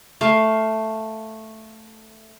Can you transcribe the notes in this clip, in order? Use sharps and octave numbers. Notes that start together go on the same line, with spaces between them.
A3 F5